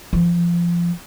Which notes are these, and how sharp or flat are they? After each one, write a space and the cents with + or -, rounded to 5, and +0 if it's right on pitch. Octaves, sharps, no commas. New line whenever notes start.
F3 -20